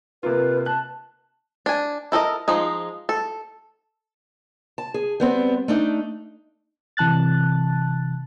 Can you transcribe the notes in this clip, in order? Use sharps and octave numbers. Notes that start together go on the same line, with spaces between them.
C3 A#3 F4 B4
A5 F#6
D4 G#5
E4 A4 A#4 D#5
F3 G#3 D#4
A4
A5
G#4
G3 B3 C4
A3 D4 D#4
C3 E3 A5 F#6 A6